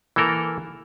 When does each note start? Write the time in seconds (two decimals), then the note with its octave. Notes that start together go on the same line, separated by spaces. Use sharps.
0.16 E3 A#3 A4 A#4